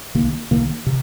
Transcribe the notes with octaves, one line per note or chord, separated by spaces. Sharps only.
C2 C3 D#3 A#3
C2 C3 D#3 A#3
C3